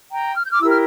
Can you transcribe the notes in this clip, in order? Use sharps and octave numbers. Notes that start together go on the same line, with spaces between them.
G5 A#5
F6
G6
D6 F6
E4 G4 A#4 E6
F6